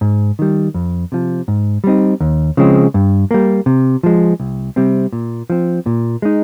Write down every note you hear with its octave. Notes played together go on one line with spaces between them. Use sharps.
G#2
D#3 G3
F2
C3 F3
G#2
G3 C4 D#4
D#2
C#3 F3 G#3 C4
G2
G3 A#3
C3
F3 G#3
C2
C3 G3 C4
A#2
F3 C4
A#2
G#3 D#4